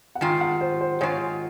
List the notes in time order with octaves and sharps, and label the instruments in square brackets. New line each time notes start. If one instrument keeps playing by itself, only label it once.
[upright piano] F#5
[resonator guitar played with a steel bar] G#2 D#3 F4 [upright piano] G5
[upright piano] F#5
C5
C5
[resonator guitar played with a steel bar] G#2 D#3 F4 [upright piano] C#5